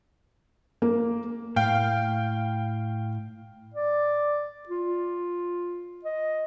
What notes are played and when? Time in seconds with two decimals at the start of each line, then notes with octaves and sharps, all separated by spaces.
0.82 A#3
1.56 A2 F5 G5
3.74 D5
4.69 F4
6.05 D#5